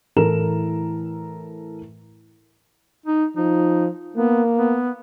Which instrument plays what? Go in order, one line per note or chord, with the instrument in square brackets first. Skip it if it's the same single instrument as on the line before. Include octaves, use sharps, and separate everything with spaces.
[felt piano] A2 E3 A4 A#4 A#5 E7
[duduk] D#4
[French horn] F3 [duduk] D#4
[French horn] A#3 [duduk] B3
[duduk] B3